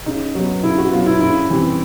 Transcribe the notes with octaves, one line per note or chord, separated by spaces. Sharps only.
C#3 D#4
F#3 B3
C#3 E4
F#4
F#3 B3 F4
E4
C#3 E4
E3 G3 C4